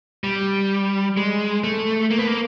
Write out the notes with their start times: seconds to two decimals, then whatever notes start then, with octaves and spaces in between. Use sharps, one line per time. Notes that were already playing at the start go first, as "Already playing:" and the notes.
0.24 G3
1.17 G#3
1.64 A3
2.11 A#3
2.18 B3
2.27 A#3